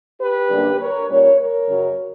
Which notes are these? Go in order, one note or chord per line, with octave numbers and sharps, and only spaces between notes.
G4 B4
F#2 D3 G3 A#3 D4
A#4 C#5
A#2 G3 C#4 A#4 C#5
A#4 C#5
F#2 C#3 F#3